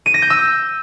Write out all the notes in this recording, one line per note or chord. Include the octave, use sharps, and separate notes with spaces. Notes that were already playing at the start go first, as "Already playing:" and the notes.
D#7
A#6
G6
E6